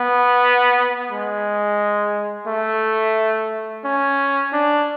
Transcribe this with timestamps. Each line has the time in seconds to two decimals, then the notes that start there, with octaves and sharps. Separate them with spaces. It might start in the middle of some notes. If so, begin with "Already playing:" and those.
Already playing: B3
1.11 G#3
2.47 A3
3.85 C#4
4.53 D4